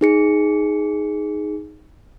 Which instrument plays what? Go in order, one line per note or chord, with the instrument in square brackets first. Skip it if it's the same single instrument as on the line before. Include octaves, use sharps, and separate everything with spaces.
[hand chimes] D#4 G#4 C#7